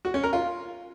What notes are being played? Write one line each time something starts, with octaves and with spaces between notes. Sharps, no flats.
F#4
C#4
A#4
F4